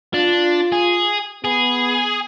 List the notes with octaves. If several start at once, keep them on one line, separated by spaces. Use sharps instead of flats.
D4 F4
G#4
B3 G#4